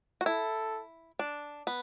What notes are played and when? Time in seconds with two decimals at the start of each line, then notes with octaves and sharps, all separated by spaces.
0.21 F#4
0.26 E4 A4
1.19 D4
1.67 B3